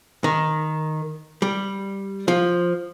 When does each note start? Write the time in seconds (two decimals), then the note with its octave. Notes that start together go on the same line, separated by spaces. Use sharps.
0.24 D#3
1.42 G3
2.28 F3